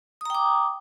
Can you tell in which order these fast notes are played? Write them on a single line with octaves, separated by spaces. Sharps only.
D#6 A#5 G5 D6